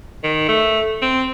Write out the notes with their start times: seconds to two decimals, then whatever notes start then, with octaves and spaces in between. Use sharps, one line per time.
0.23 D#3
0.49 A3
1.02 C4